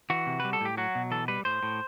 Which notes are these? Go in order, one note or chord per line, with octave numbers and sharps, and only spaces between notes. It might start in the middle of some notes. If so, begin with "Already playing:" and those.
E3 F#4
C3
G3 B4
A4
A2 G4
F#3 F#4
B2
E3 A4
G3 B4
A2 C5
A2